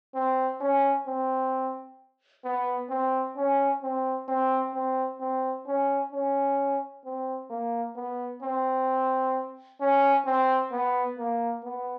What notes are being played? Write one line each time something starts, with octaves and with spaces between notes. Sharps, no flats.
C4
C#4
C4
B3
C4
C#4
C4
C4
C4
C4
C#4
C#4
C4
A#3
B3
C4
C#4
C4
B3
A#3
B3